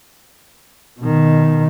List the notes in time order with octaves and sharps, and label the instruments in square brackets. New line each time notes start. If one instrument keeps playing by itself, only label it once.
[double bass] B2 D#3